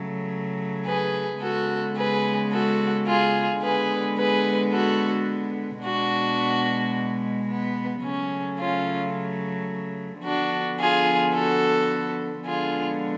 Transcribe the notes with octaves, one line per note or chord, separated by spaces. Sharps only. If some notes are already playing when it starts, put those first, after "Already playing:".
Already playing: C#3 F#3 A3
G#4 B4
C#3 G#3 B3 F#4 A4
G#4 B4
F#4 A4
F4 G#4
D3 G#3 B3 G#4 B4
G#4 B4
F#4 A4
B2 G#3 B3 D4 F#4
B3
C#3 F#3 A3 C#4
C#4 F4
D3 F3 B3 D4 F#4
F4 G#4
F#4 A4
D3 F3 G#3 B3 F4 G#4